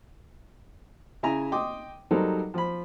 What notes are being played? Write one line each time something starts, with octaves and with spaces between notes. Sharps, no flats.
C#3 E4 E5 G#5 A#5
D#5 G5 C6 D6 D#6
F#3 G3 D#4 A4 A#4 C5
F3 B5